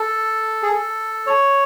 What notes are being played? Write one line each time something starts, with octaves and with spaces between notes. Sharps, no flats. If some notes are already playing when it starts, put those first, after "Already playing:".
Already playing: A4
G#4
A4
C#5